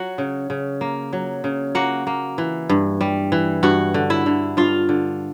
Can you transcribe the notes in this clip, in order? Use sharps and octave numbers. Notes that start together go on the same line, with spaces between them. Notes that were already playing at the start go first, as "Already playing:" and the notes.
Already playing: F#3 F#4 F#5
C#3
C#3
A#3
F#3
C#3
A#3 F#4 F#5
A#3
E3
G2
G3
E3
G2 F#4 F#5
D3
E4 E5
D3
G2 F4 F5
D3